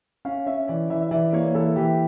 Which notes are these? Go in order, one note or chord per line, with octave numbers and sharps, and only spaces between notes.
C#4 F5
C#4 E5
E3 D5
E3 E5
E5
E3 D5
A#3 C#5
E3 A4
E3 G4